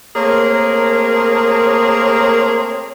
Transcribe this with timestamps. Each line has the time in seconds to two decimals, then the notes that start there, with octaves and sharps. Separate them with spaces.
0.16 A3 A#3 C4 G#4 A#4 C#5